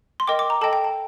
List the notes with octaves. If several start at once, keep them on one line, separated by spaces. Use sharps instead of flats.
C6
A#4 D#5 G5 D6
D6
A#5
A4 D#5 G5 A5
G5
A5